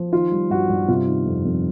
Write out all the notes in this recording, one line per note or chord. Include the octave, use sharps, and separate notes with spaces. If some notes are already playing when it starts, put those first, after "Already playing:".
Already playing: F3
D#3 F4
G3
G2 F#4
G2
C3 F4
D#3
F2
F2